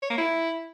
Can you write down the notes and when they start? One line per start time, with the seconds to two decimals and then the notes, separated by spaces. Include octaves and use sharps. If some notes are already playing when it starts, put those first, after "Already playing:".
0.02 C#5
0.10 A#3
0.18 E4